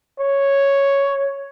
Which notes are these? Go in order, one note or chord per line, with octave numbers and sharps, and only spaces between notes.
C#5